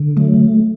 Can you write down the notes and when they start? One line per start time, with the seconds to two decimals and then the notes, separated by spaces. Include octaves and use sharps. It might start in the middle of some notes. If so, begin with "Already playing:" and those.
Already playing: D3
0.17 F#3 A3